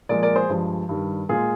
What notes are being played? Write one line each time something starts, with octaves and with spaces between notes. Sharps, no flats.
A#2 F3 G#3 A#4 D5
A#4 D5
G#4 C5
G2 F3 G#3
G2 D#3 G3
A#2 G#3 F4 G#4